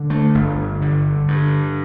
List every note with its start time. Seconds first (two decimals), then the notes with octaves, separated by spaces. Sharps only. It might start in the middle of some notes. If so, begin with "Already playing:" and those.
Already playing: D3
0.10 A3
0.35 G1
0.82 D3
1.28 G2